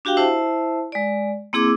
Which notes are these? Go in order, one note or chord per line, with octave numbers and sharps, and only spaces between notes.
D4 F#4 G4 F5 G5
E4 C5 E5 A5
G#3 D5
A#3 C4 E4 G#4 D6 E6